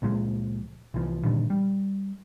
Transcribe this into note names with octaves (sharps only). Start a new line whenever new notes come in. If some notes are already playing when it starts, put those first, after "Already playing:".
C#2 A#2 F3 G#3
C2 E3 F3
G2 A#2 D3 D#3
G3